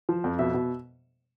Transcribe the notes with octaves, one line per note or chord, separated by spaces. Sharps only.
F3
F2
B2 E5
B2